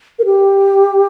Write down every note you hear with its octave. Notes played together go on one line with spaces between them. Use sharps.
A#4
G4